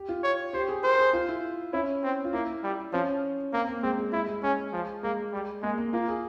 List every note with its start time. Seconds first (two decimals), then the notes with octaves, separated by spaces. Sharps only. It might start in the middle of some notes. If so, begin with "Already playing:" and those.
Already playing: G4
0.09 F4
0.24 C#5
0.53 G4 C5
0.69 G#4
0.83 A#4 C5
0.99 G#4
1.13 F4
1.28 E4
1.73 C#4 E4
2.03 C4
2.24 F4
2.33 A#3 E4
2.63 G3
2.93 F3 C#4
3.53 A#3 C4
3.68 A#3
3.82 G#3 C4
3.98 G#3
4.12 G#3 E4
4.28 G#3
4.43 G#3 C#4
4.73 F3
5.03 G#3 A#3
5.32 G3
5.62 G#3 A#3
5.78 A#3
5.93 A#3 F4
6.08 G#4